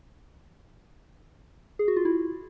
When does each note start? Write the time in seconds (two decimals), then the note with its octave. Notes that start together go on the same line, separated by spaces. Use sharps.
1.79 G#4
1.88 F#4
1.97 F4
2.05 E4